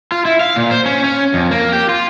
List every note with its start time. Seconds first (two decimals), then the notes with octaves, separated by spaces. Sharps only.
0.12 F4
0.25 E4
0.41 F5
0.56 A#2
0.71 C5
0.86 C#4
1.04 C#4
1.34 F2
1.51 A#3
1.73 G4
1.89 F4